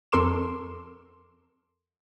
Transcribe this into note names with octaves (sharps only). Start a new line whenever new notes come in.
F2 A4 A#4 C6 D6 E7